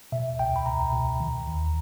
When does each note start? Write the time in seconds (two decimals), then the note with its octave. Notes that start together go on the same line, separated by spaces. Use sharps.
0.12 B2 E5
0.39 C#2 G5
0.56 B5
0.66 B2 A#5
0.93 B2
1.20 D#3
1.48 D#2